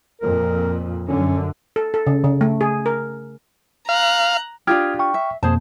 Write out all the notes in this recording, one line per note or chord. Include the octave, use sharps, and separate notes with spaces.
F2 A#2 A#4
F#2 D3 C#4
A4
A4
C#3
C#3
A3
G#4
A#4
F5 A#5 F#6
D4 F4 G4 D#6 F6 G#6
G5 C#6 F6
E5
F2 B2 A#3 G#4 C5 A5